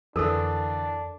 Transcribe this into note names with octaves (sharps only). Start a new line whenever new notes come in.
F2 D3 E3 D4 A4 A#4